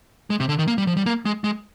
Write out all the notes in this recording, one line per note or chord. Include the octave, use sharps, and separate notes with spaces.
G#3
C3
D3
D#3
A#3
G3
F3
G3
A#3
G#3
G#3